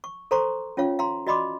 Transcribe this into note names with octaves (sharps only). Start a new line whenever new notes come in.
C#6
A4 C5 A#5 C6 C#6
C#4 F4 C#5 F5
F5 A#5 C6
F#4 D5 D#5 B5 C6 D6